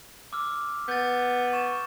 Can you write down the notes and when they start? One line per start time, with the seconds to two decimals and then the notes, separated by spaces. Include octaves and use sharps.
0.33 D6 E6 F6
0.88 B3 G6 A6
1.53 C#6 E7